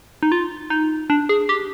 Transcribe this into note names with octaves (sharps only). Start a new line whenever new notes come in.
D#4
F4
D#4
D4
G#4
G4